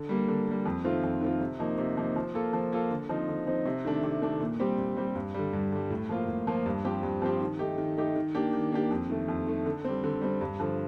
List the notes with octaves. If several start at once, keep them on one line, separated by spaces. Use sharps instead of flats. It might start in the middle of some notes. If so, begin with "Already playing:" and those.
Already playing: D3
G3 A#3
D3
G3 A#3
F2
D#3 A3 C4 F4
F2
D#3 A3 C4 F4
C3
F3 A#3 D#4
C3
F3 A#3 D#4
F3
A#3 F4 A4
F3
A#3 F4 A4
D3
F3 C4 D#4
D3
F3 C4 D#4
C3
D#3 A3 D4
C3
D#3 A3 D4
A#2
G3 C4 G4
A#2
G3 C4 G4
G2
D3 G3
G2
D3 G3
A2
F3 A#3 F4
A2
F3 A#3 F4
G2
F3 C4 G4
G2
F3 C4 G4
D#3
A3 D#4 G4
D#3
A3 D#4 G4
D#3
A#3 D4 G4
D#3
A#3 D4 G4
F2
D#3 A3
F2
D#3 A3
D3
G3 C4
D3
G3 C4
G2
D3 F3